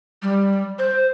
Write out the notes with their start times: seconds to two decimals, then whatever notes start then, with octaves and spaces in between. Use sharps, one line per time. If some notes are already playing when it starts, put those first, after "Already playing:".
0.22 G3
0.79 C5